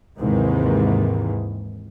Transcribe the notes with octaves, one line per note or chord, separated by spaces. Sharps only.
D#2 G#2 C3 D#3 E3 G#3